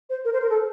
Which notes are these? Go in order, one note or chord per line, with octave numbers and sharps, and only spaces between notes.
C5
A#4
C5
A#4
A4